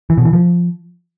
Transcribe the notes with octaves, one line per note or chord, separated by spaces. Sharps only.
E3
B2
E3
F3